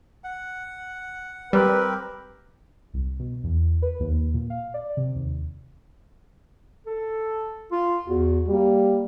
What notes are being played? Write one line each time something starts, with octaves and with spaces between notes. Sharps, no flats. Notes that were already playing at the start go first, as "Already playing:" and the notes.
F#5
G3 C4 G4 A#4 B4
C2
B2
E2
B4
D#2
A#2
F5
D5
C3
D#2
A4
F4
E2 F#4
G3 A#3